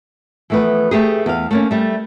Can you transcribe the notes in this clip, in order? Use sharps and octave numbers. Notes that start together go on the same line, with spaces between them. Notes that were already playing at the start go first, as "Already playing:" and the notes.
E3 F3 A3 B3 B4
A3 G4 G#4
E2 F5
A3 A#3 C#4
G3 A3